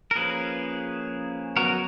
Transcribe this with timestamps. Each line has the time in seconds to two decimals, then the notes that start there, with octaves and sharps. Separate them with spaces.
0.11 A#4
0.15 F3 A#3 C#4 G#4 B4
1.57 F#3 B3 F#4 A#4